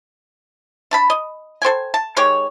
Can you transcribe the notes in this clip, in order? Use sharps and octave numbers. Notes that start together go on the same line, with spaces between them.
D4 A5 B5
D#5
A4 C5 G5 G#5
A5
D#3 G#3 G4 C#5